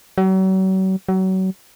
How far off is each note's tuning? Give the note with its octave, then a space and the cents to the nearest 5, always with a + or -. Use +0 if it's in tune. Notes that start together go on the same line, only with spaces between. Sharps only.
F#3 +40
F#3 +30